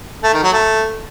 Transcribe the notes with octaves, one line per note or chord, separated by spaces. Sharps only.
A3
D#3
F#3
A3